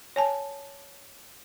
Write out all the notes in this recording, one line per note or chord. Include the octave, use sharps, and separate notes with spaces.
C#5 G#5 A5